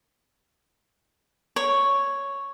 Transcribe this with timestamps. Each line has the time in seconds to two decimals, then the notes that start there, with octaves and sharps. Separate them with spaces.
1.56 C#5